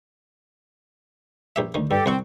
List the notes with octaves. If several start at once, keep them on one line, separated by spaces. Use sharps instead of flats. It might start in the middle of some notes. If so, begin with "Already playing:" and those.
A#1 G4 E5
D2 D#3
G2 G4 A4
C2 C4 F#5 C#6